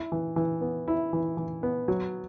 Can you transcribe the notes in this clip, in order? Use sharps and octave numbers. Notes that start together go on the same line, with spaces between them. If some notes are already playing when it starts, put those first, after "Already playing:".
Already playing: E4
E3
E3
B3
E4
E3
E3
B3
F#3